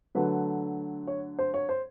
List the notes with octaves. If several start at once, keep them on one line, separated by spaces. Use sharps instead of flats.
D3 F#3 A3 B4
C#5
C5
C#5
C5